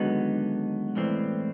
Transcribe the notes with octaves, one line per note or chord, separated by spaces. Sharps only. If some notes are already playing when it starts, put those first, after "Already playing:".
Already playing: D#2 D3 F#3 G#3 B3 D#4
B1 A2 E3 G3 C4